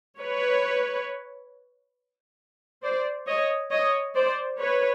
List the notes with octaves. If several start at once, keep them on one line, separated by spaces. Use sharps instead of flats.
B4 C#5
C5 D5
C#5 D#5
C#5 D#5
C5 D5
B4 C#5